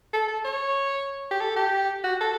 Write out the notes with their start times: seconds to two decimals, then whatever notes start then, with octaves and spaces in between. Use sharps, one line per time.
0.13 A4
0.28 A4
0.44 C#5
1.31 G4
1.40 A4
1.56 G4
2.04 F#4
2.21 A4